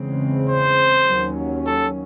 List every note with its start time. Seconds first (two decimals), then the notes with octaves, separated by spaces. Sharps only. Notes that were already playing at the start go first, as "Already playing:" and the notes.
Already playing: E2 C#3 G#3 C4
0.49 C5
1.08 D#2 D#3 F#3 C#4
1.67 A4